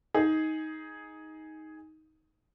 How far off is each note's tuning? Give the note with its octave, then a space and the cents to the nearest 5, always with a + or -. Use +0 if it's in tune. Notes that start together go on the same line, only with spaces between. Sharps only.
D#4 +15 G#4 +0